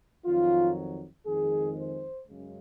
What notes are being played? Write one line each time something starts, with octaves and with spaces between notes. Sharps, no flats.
F2 D#3 F#3 F4
F2 D#3 G#3 G#4
C5
F#2 C#3 G#3